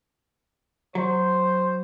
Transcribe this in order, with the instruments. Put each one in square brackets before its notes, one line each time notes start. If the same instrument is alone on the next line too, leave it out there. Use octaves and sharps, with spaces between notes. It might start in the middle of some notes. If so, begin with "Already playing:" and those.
[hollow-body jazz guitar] F#3 [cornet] C5